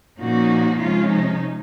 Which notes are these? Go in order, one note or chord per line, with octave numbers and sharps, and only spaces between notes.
A#2 F3 A#3 C#4 D#4 F#4
C3 F3 G#3 C#4 F4
D#4